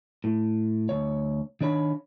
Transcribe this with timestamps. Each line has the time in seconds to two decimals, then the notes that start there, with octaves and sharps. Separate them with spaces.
0.24 A2
0.89 D2 C#5
1.61 D#3 D4 C#5 B5